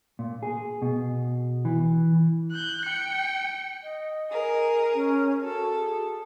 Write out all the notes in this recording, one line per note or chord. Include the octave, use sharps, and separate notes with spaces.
A#2
G#4
B2
E3
F#6 G6
G5 C#7
D#5
G#4 A#4
C#4
F#4 A4
G#4